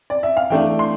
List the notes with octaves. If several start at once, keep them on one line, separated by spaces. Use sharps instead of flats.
D5
E5
F5
E3 A3 D4 G5
C6